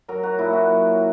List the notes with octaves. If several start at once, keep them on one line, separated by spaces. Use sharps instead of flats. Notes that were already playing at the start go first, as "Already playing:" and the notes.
F#3 A#4
F#4
A#2 E4
F#4
F#3